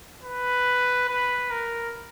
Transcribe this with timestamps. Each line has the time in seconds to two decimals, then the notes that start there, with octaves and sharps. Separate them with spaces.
0.23 B4
1.08 B4
1.51 A#4